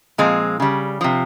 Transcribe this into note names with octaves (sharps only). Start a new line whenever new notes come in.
A#2 F3 G#3 C4
C#3 G3
C3 F3